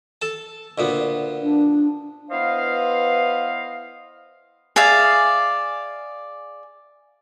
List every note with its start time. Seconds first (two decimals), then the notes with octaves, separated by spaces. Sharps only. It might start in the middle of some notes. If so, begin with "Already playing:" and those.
0.22 A4 A5
0.78 D2 A#2 B3
1.42 D4
2.31 B3 E4 B4 C5 D#5 F5
4.76 G#4 D5 E5 F5